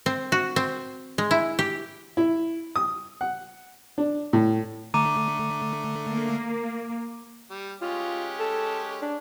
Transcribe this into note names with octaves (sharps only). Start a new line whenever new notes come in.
C4
F#4
C4
G#3
E4
G4
E4
D#6
F#5
D4
A2
D3 A3 A#5 D6 D#7
A#3
G3
G#3 C#4 F4 G4
A4
D4